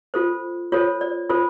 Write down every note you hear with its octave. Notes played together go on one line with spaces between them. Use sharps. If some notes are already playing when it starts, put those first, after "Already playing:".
F4 A4 C5
F4 A4 C5 C#5
D5
F4 A4 C5